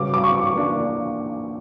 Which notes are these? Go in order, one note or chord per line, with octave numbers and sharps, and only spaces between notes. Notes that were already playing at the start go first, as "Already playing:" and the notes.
Already playing: C#3 G3 C#4 F#4 B4 D6
D6
C#6
E3 A#3 D4